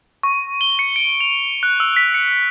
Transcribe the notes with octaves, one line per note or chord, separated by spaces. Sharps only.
C#6
G7
C#7
D7
F7
F#6
E6
B6
C#7